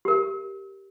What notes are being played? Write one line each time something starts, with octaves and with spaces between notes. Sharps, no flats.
G4 A#4